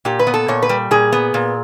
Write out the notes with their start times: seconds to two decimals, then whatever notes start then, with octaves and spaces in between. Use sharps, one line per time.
0.05 A#2 G4
0.19 B4
0.27 B3
0.34 A4
0.48 A#2 C#5
0.62 B4
0.69 G3
0.91 A#2 G#4
1.12 B3
1.34 A#2